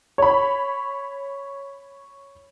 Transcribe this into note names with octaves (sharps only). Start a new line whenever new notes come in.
C#5 B5